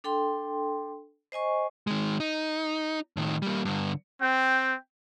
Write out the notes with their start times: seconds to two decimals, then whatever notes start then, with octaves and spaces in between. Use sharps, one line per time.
0.04 D4 A4 G5 C6
1.32 C5 D#5 G#5 C#6
1.87 D#3 G#3
2.20 D#4
3.17 A2 D#3
3.42 G3 A#3
3.65 G2 D3
4.21 C4 G5